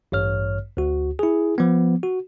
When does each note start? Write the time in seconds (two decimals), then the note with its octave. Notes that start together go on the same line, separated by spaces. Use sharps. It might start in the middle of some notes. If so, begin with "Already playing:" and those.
0.12 A1 G2 C#5 F6
0.77 D2 F#4
1.19 E4 G#4
1.58 F3 B3
2.03 F#4